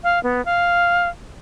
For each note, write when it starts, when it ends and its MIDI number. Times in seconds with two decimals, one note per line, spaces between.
0.03 0.21 77
0.23 0.43 59
0.45 1.09 77